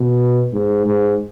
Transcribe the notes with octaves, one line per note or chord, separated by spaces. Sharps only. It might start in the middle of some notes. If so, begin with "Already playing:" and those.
Already playing: B2
G#2
G#2